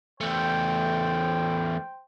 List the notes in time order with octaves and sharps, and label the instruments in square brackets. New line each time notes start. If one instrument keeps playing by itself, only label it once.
[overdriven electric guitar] E2 A3 [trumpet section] C5 G5